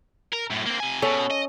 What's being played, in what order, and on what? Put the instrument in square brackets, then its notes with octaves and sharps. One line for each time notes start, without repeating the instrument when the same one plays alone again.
[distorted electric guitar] A#4
F#2 A2
A#3 C4
C3 G#5
[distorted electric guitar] B2 [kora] C#4 A4
[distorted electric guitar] D#5